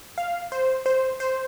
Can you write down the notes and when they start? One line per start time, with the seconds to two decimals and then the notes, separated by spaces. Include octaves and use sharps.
0.18 F5
0.52 C5
0.86 C5
1.20 C5